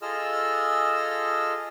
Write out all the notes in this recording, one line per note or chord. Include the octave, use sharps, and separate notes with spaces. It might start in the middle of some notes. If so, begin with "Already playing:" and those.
F4 G#4 A4 D#5 E6 F6